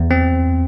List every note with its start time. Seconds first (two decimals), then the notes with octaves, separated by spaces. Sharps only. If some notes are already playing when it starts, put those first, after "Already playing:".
Already playing: E2
0.11 C4